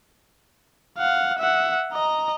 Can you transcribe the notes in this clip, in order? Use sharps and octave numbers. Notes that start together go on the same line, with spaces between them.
F5 F#5
E5 F#5
D#5 A#5